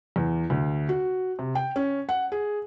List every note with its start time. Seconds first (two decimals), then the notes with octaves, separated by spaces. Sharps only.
0.16 E2
0.50 D2
0.89 F#4
1.39 C3
1.55 G5
1.76 C#4
2.09 F#5
2.32 G#4